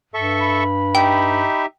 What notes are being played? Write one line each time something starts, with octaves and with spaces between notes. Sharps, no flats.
G2 A4 E5 C#6
B5
D#4 G4 E5 G5